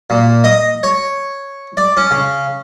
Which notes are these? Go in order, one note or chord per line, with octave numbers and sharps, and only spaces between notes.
A#2
D#5
C#5
D5
C#4
C#3